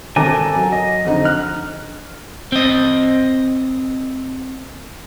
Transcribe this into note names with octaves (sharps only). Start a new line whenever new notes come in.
G#1 A4 A#4 G#5 D6
F#3
D#5
F2 D3 D#4
F6 F#6
C4 D#5